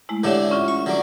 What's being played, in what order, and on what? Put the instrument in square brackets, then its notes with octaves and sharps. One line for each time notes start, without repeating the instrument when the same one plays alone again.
[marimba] G#3 A3 E4
[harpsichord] A2 D3 D4 [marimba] G4 C#5 E5
[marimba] C#4 F4 E5
[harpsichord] C#6
D3 F#3 D6